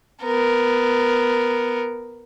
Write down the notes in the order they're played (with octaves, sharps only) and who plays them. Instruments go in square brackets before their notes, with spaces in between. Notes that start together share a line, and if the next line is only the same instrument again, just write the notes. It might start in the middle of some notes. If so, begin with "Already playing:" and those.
[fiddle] B3 A#4